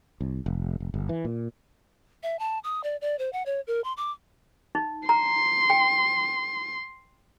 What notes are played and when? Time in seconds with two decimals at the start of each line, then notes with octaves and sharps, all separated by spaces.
0.21 C2
0.46 F1
0.80 F1
0.94 G1
1.09 E3
1.25 A#2
2.23 E5
2.39 A5
2.64 D#6
2.84 D5
3.01 D5
3.19 C5
3.33 F#5
3.46 C#5
3.67 A#4
3.84 C6
3.97 D6
4.75 D#4
5.09 A#5 C6
5.70 G5